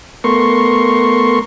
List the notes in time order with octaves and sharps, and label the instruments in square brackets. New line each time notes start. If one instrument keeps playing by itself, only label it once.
[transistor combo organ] A3 B3 A#4 C6 C#6